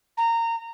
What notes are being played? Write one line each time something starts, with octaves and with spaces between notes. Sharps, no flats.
A#5